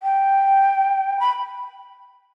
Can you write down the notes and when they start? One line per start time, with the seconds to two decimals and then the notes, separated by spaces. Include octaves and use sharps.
0.03 G5
1.20 B5